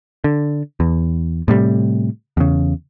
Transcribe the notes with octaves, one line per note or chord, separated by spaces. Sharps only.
D3
E2
A2 C3 G3
E2 C#3